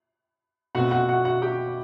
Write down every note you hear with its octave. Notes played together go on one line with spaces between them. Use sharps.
B2 A3 C4 F#4 F#5
F#4 F#5
F#4 F#5
F#4 F#5
G4 G5